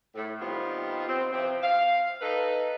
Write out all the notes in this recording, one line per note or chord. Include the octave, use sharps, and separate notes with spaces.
A2
D#3 G3 B3 C4 D#4 F4
C4
C3 E3 F3 C4
F5
D#4 A4 B4